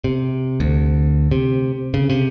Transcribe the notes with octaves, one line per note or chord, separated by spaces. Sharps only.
C3
D2
C3
C#3
C3